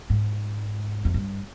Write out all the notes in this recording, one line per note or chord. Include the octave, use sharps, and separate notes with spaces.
G#2
F2
G2